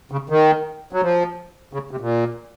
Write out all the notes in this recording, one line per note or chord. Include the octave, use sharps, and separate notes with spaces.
C#3
D#3
F#3
F3
C#3
C3
A#2